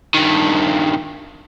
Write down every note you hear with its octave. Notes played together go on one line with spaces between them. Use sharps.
G2 D#3